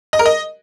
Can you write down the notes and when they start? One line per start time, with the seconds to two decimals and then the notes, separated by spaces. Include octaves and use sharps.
0.13 D#5
0.19 A#4
0.26 D#5